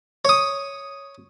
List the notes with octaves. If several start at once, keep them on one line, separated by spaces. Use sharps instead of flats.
C#5 D#6